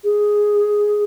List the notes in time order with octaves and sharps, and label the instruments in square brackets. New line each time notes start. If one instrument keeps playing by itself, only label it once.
[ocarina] G#4